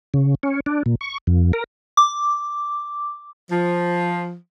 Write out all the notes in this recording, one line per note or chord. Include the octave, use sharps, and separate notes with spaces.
C#3
C#4
D4
A#2
C#6
F2
A#4
D6
F3